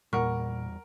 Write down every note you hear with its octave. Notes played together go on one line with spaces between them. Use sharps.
E2 A#2 G3 A#4 F#5 C#6